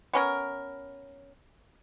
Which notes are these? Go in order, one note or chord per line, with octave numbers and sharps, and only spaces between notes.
B3 C#4 A#4